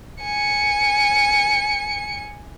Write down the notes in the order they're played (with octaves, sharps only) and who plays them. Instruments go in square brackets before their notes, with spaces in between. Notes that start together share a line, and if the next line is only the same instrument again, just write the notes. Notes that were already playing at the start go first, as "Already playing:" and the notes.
[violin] G#5 C#7